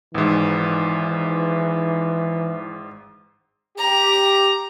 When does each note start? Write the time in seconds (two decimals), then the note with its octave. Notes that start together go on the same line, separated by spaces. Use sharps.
0.15 G#1 G#2 E3
3.78 G4 A#5